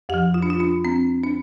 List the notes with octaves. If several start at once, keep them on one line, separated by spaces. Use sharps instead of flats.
F2 F3 G4
F4
D4
F4
D4
C4
D4